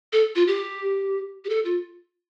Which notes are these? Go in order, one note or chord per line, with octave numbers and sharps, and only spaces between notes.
A4
F4
G4
G4
A4
F4